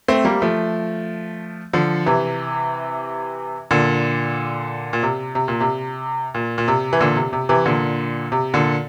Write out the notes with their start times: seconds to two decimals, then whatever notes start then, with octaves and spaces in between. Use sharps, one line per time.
0.08 A3 C4
0.25 G3 A#3
0.42 F3 A3
1.73 D3 F3
2.06 C3 E3
3.71 A#2 D3
4.93 A#2
5.03 C3
5.35 C3
5.48 A#2
5.61 C3
6.35 A#2
6.58 A#2
6.68 C3
6.93 E3
7.00 A#2 D3
7.16 C3
7.33 C3
7.49 C3 E3
7.66 A#2 D3
8.32 C3
8.54 A#2 D3